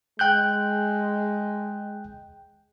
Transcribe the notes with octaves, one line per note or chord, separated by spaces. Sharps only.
G#3 G5 F#6 G6